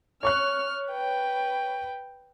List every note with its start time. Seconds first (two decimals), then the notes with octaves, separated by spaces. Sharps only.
0.23 C#5 C#6 F6 F#6
0.89 B4 G5